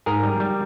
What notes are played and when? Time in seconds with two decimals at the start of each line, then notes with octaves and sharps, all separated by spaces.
0.06 G#2 G#4 A#4
0.23 G3
0.40 G3